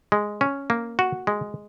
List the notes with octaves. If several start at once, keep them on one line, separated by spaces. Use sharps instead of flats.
G#3
C#4
A#3
F#4
G#3